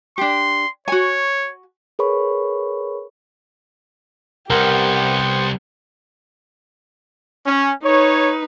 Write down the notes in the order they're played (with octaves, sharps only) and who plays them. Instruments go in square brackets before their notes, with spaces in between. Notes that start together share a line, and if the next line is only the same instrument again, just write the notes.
[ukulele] D4 G4 [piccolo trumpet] C6
[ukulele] F#4 G#5 [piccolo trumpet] C#5
[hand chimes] G#4 A#4 B4 C#5 B5 C#6
[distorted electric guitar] C2 [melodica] B3 C5 F#5 [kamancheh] G4 [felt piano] A#4
[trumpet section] C#4
[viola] D#4 B4 [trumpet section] C#5